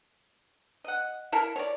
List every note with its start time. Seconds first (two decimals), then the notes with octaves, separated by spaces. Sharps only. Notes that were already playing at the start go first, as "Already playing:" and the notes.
0.84 D#5 F#5
1.32 E4 A4 A#4
1.56 C#5 D5